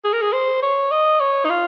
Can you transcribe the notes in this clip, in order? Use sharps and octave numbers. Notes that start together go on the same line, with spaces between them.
G#4
A#4
G#4
C5
C#5
D#5
C#5
D#4
F4